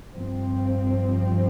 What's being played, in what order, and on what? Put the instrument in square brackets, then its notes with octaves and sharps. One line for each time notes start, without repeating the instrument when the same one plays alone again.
[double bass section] G2 F3 C4